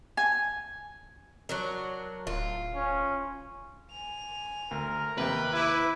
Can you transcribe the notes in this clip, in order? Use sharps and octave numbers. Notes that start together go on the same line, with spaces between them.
G#5
F#3 D4 A#4
D1 F4
C#4
G#5 F7
D2 A#4
D#2 C3 B4 G5
E4 B5 D6